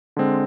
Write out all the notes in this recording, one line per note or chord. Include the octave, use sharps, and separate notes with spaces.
D3 G#3 C4